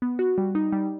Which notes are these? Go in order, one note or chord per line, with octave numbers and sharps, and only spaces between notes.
B3
F#4
G3
D#4
G3